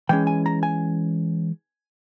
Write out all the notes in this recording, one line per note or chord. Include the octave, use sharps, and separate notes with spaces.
E3 G#3 C#4 G5
G#5
A#5
G#5